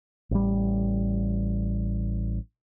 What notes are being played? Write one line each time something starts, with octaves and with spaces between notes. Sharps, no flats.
A1 G3